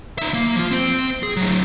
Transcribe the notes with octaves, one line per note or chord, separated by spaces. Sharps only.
D#4 E5
A#3
F3 F4
C4 C5
G#4
A2 F#3